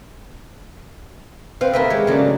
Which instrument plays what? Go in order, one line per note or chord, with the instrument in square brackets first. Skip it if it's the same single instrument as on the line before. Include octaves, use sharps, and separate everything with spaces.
[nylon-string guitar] C4 B4 C5 [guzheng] F5
[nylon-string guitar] D2 D#3 [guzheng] A#4 B4 E5
[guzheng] G#3 C#5 [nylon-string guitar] G4
[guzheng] C#3 F#3 [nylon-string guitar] A3 A#3 D4